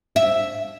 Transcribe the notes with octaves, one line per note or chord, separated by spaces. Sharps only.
E5